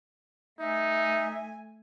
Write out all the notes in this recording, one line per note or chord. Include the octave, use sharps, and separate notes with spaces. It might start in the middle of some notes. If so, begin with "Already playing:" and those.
A3 D#4 E5 G#5